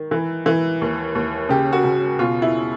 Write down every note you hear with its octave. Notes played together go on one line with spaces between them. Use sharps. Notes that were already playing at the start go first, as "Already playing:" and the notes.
Already playing: D#3
E3
E3
D#2
D#2
C#3 G4
F#4
C#3
B2 F4
E4